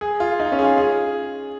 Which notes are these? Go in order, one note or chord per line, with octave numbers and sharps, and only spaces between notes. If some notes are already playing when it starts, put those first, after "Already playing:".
G#4
F4
D#4
C#4
G#4
F4
G#4